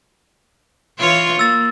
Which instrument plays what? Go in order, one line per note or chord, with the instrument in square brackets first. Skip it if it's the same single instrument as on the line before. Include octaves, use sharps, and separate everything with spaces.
[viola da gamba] E3 F4 C#5
[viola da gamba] A#3 [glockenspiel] E6 A6